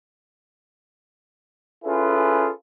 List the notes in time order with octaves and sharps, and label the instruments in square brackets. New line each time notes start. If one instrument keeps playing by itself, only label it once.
[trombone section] C#4 E4 F4 G#4 A4 B4